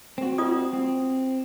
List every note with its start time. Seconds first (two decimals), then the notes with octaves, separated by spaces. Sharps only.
0.18 C4 F#4
0.38 F4 D5 D#6
0.73 C4